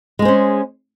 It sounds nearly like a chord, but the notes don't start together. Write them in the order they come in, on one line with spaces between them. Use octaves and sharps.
G#3 G#4 C5 C#4